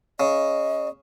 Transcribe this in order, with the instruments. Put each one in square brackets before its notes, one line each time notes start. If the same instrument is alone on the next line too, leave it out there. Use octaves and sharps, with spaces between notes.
[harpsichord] C#3 [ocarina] D#5